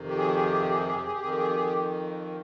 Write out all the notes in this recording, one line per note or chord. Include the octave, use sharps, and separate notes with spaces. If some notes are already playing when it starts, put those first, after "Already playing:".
Already playing: F2 C3 D#3
G4
G#4
G4
G#4
G4
G#4
G4
G#4
G4
G#4
G4
G#4
G4
F2 D#3 G#4
G4
G#4
G4
G#4
G4